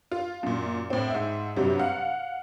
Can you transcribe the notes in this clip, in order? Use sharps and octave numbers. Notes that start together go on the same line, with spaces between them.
F4
F#2 A#2
A2 C4
G#2 E5
G2 C3 F#3 G3
F5 F#5